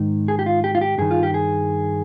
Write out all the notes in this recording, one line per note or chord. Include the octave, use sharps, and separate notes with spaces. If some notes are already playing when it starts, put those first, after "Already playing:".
Already playing: G#2 D#3
G#4
G4
F4
G4
F4
G4
G2 D#3 G#4
F4
G4
G#4